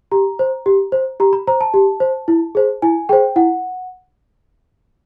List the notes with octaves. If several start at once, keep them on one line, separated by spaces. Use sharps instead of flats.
G4 A#5
C5
G4
C5
G4 A#5
B5
C5 A#5
A5
G4
C5
E4
G#4 C5
E4 G#5
G#4 C5 G5
E4 F#5